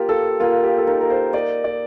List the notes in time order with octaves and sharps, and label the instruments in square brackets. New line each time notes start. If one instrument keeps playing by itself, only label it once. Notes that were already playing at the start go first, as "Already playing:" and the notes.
Already playing: [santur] A#3 [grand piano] F4 G4
[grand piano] A4
[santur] A#3 [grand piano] F4
[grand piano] G4
A4
[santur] D#4 [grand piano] A#4
[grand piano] A#4
C5
[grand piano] D5 [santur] D#5
[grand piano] D5